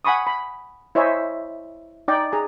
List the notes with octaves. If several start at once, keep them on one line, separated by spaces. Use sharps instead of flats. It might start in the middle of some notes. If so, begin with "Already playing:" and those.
F#5 G#5 B5 C#6 D#6
B5
E4 C5 C#5 D#5 E5 G#5
D#4 D5 G5
G#4 A#5